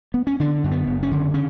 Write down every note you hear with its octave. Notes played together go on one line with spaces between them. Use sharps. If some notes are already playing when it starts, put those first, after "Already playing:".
B3
C#4
D3 D4
F#2
B3
F#1
C#4
D3
C#3 C#4